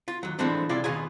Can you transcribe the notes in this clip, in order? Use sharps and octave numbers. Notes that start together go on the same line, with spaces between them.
F4
D#2 F#3
E3 F3 G#3 A3 C4 D4
C3 E4 F4 G#4 D5
D#2 B2 F4 G#4 G#5